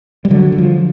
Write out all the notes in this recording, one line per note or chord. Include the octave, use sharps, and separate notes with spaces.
G3
D3 F#3
F#3
F3